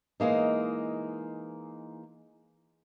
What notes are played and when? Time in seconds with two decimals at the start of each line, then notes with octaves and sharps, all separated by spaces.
0.20 E3 G#3 A#3 D#4